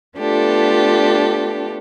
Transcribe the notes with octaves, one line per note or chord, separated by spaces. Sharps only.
A3 B3 D4 F4 G4 A4